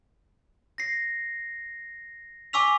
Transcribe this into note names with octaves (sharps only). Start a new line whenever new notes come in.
A#6 C7
G#5 C#6 D6 E6 B6 F7